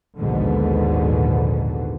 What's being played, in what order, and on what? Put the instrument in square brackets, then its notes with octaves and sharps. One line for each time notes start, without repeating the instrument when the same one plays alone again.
[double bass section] A#1 D#2 G#2 B2 D3